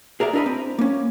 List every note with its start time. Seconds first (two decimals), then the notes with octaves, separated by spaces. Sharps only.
0.20 G#4 A#4 D5 E5
0.33 D4 E4 A#4 D#5 B5
0.46 C4
0.78 A#3 C#4